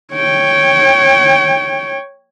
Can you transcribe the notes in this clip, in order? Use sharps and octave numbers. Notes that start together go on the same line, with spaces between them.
C#5 G5